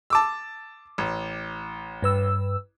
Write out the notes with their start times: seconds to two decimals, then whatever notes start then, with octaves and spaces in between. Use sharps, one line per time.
0.10 A5 D6 E6
0.98 A1
2.02 G2 B4 E6